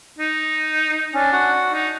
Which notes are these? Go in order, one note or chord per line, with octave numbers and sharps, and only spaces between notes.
D#4
C#4 D4
F#4 F#5
D#4